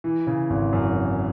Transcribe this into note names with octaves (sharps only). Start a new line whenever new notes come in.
E3
C#3
G#1
F#2
E3